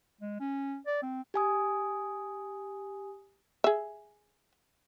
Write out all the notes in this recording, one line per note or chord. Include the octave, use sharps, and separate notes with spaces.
G#3
C#4
D5
C4
G4 G#5 D#6
G#4 E5